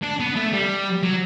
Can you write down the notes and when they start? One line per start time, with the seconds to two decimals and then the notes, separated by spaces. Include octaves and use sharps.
0.03 D4
0.20 B3
0.36 A3
0.53 G3
1.03 F#3